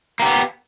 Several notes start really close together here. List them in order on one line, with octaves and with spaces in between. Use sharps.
A#3 G4 B3